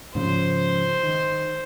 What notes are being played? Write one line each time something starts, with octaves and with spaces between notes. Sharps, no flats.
G#2 C#3 F3 C5
D#3